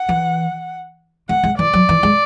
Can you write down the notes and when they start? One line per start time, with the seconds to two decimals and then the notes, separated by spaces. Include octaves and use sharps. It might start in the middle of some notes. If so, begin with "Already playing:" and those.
Already playing: F#5
0.09 E3
1.29 A3 F#5
1.44 G#3
1.59 E3 D5
1.73 F#3
1.89 E3
2.03 G#3